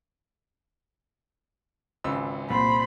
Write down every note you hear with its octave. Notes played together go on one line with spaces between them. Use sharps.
G#1 C#2 E6
C2 A#2 C5 B5